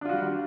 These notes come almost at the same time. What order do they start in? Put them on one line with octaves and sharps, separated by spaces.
D4 F4 F#4 G3